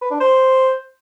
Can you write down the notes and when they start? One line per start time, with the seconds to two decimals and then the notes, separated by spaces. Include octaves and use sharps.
0.01 B4
0.11 D4
0.20 C5